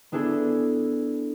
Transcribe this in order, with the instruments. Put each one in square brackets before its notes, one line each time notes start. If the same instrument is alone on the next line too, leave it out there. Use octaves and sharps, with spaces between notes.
[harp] B3 D4 E4 G#4 A4